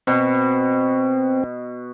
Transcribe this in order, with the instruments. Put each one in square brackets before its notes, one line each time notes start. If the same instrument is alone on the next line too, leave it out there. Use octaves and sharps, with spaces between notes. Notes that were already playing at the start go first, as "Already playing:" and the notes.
[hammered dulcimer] B2 [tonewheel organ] C4